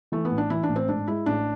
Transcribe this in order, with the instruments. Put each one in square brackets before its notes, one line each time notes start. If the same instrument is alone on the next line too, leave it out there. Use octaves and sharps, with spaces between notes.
[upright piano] E3 [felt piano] A3
[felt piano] B3
[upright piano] A1
[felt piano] D4
[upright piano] E3 [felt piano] E4
[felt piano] D4
[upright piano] A1
[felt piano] C4
[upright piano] G#2 [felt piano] D4
[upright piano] G#3 [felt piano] E4
[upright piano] A1 [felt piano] D4